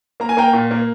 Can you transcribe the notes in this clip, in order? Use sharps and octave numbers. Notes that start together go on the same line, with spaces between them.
A#3 A#5
G#5
A#3 G5 A#5
A#2
A#3